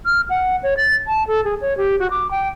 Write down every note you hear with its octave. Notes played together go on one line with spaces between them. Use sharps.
F6
F#5
C#5
A6
A5
A4
G#4
C#5
G4
F#4
D6
G5